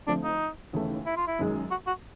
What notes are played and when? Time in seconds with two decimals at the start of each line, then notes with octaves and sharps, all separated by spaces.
0.07 D3 F3 A3 C4 D4
0.24 D#4
0.73 D#2 C#3 E3 A3
1.06 E4
1.17 F4
1.27 E4
1.39 F#2 D#3 G#3
1.71 F#4
1.87 F#4